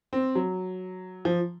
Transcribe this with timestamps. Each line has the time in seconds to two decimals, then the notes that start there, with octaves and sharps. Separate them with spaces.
0.13 C4
0.35 F#3
1.25 F3